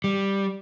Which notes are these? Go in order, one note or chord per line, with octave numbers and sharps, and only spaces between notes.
G3